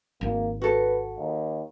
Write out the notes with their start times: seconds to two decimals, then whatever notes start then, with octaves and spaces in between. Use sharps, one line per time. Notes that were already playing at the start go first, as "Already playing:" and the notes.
0.21 G#1 A#3
0.61 F#4 A4 B4
1.17 D#2